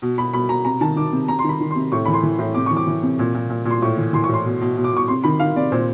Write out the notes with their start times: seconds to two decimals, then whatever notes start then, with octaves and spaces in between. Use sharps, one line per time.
0.02 B2
0.18 B2 B5
0.33 B2 B5
0.49 B2 A#5
0.65 C3 A#5
0.81 D#3 A5
0.96 D#3 D6
1.12 C3
1.28 C3 A#5
1.39 C6
1.44 D#3 B5
1.61 D#3
1.71 C3 C6
1.92 A2 C#6
2.05 B5
2.08 E3
2.13 C6
2.23 E3
2.39 A2
2.54 C3 D6
2.66 E3 C#6
2.77 D6
2.87 E3
3.03 C3
3.19 A#2
3.34 A#2
3.50 A#2
3.65 A#2
3.71 C6
3.82 A2 C#6
3.98 E3
4.13 E3 C6
4.24 A2 C#6
4.34 C6
4.45 B2
4.61 B2
4.77 B2
4.84 D6
4.93 B2 C#6
5.08 C3 C6
5.24 D#3 B5
5.40 D#3 F5
5.56 C3 D5
5.72 A#2 C5